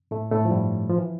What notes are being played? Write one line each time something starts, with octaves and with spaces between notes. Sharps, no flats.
A2 A3
A2 A3
F3
G2 G3
F3
E3